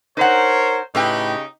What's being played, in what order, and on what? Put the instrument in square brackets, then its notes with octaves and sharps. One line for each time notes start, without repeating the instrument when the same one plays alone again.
[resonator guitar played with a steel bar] D#4 F#5 [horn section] A#4 C5 C#5
[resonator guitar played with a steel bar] A2 B4 G5 [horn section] C#3 D#4 G4